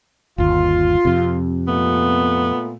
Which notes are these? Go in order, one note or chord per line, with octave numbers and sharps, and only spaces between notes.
G1 D#2 F4
F2 C3
A#2 A3 B3